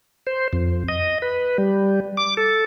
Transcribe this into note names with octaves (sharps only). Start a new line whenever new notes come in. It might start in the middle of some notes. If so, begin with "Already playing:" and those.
C5
F2
D#5
B4
G3
D6
A4